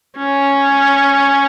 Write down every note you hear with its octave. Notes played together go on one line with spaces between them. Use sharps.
C#4